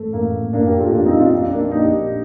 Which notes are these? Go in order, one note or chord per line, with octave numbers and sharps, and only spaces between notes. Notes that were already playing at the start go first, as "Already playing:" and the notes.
Already playing: A1 A2 A3
A1 A2 A#3
A1 A2 A#3 D4
G4 A#4
F4 A4
A1 A2 D4 F4
C4 D#4
D4 F4
A#1 A#2
A#3 D4
A#1 A#2 D#4 G4